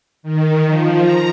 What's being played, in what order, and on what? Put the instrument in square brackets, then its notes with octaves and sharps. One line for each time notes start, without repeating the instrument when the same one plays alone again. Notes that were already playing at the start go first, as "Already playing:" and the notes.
[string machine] D#3
F3
A#5